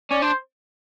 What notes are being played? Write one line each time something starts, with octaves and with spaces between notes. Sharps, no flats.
C#4 D5
D4 C5